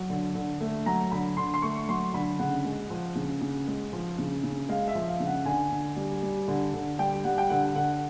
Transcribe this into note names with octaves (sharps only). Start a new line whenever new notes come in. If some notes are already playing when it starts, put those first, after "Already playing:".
Already playing: F#3
D3
D3
A3
F#3 A#5
D3 B5
D3 C6
C6
A3 C#6
F#3 C6
D3 B5
C#3 F#5
G#3
F3
C#3
C#3
G#3
F3
C#3
C#3
G#3 F5
E5
F3
F5
C#3
F#5
D3 G#5
D3
G3
G3
D3
D3
G3 G5
G3 F#5
G5
D3 F#5
D3 F#5